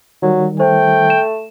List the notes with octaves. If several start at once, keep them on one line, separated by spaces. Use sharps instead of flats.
D#3 F#3 G3
A3 C5 G5
E7